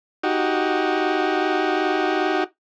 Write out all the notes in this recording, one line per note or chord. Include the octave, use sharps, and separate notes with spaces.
D#4 F#4 G4